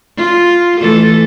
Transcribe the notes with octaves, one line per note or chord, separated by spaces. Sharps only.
F4
E3 A3 A4